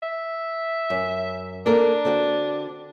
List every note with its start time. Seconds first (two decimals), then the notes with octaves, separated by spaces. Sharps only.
0.03 E5
0.90 F#2
1.66 A#3 D4 A4 A#4
2.05 D3 C4 F#4